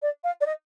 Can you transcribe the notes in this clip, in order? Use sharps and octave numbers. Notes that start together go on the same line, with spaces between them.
D5
F5
D5
D#5